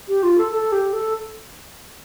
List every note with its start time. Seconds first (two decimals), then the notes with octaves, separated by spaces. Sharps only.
0.08 G4
0.23 F4
0.38 A4
0.52 A4
0.72 G4
0.93 A4